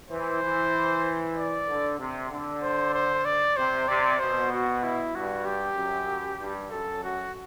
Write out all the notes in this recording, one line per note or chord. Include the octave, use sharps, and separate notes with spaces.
E3 C5
E3
D5
D3
C3
D3
C5
C5
D5
C3 C5
C3 D5
B2 C5
F#4
E4
G2 F#4
G4
F#2
G2
F#2 A4
F#4